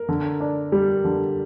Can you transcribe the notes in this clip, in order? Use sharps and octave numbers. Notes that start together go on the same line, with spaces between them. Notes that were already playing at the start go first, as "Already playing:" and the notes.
Already playing: A#4
D3
D4
G3
D3